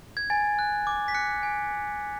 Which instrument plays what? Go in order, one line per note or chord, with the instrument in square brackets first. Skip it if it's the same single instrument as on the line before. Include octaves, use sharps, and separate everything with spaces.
[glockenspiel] G#6
G#5 A6
F#6
D6
B6
F#6 C#7
G#5